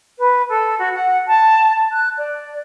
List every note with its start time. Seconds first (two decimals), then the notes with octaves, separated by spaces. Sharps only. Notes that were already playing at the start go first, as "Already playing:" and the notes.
0.19 B4
0.49 A4
0.79 F#4
0.95 F#5
1.28 A5
1.92 F#6
2.18 D5